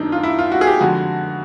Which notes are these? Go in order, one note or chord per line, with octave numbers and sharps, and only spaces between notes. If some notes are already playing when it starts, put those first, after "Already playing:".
Already playing: F#2 D#3 F#3 D4 D#4
F4
E4
F4
F#4
G#4
G4
F2 D3 F3 G#3 F#4